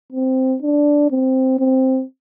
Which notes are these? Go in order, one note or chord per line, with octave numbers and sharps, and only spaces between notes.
C4
D4
C4
C4